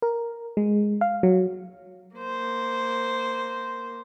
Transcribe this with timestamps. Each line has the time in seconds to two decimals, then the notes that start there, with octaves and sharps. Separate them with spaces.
0.02 A#4
0.57 G#3
1.01 F5
1.23 F#3
2.16 A#3 C5